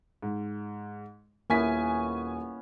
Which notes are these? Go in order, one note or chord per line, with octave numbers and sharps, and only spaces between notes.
G#2
D#1 A#3 B3 C#4 E4 G#5 B6